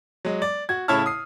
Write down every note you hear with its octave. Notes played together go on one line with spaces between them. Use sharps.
F#3 G#3
D5
F#4 G#6
A2 C#3 E4 C#5 A5 F6
D#6 C7